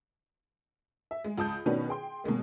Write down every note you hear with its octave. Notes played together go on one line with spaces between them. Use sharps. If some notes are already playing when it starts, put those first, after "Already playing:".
E5
G#3
C#2 A5 D#6 G6
B2 D#3 C#4 D4 F#4 B4
G#4 G5 C6
B2 F#3 G#3 A#3